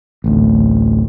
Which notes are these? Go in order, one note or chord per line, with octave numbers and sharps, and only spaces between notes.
A1 D2